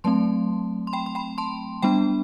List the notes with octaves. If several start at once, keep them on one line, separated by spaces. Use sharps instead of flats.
F#3 A3 C4 A5 C6
C6
G5 B5
C6
G5 B5
A5 C6
G3 B3 D4 G5 B5